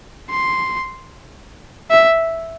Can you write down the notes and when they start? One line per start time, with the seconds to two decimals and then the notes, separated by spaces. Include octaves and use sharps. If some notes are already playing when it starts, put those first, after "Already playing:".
0.30 C6
1.91 E5